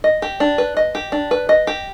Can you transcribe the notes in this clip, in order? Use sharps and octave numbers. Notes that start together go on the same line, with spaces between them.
D#5
G4
D4
B4
D#5
G4
D4
B4
D#5
G4